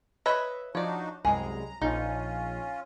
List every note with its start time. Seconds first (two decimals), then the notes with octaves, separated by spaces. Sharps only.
0.26 B4 C#5 D#5 E5
0.75 F3 D4 D#4 F#4 C#5 D5
1.25 C2 F#2 G#3 G#4 A#5
1.82 A#1 C#4 D#4 F4